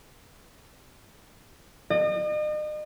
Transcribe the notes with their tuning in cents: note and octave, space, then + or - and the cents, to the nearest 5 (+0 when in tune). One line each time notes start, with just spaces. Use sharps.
D#5 -40